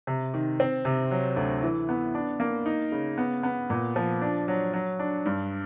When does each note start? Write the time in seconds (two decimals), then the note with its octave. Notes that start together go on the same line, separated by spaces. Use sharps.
0.07 C3
0.34 D#3
0.60 C4
0.85 C3
1.11 F#3
1.36 D2
1.62 E3
1.89 B3
2.15 D4
2.40 A#3
2.66 D#4
2.92 C#3
3.18 B3
3.43 B3
3.70 A#2
3.96 F3
4.21 D4
4.48 F#3
4.74 F#3
4.99 D4
5.26 G2